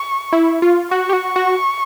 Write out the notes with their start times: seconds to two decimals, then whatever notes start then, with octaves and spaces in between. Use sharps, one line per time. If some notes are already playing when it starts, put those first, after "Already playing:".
Already playing: C#6
0.33 E4
0.62 F4
0.91 F#4 C#6
1.09 G4
1.13 F#4
1.36 F#4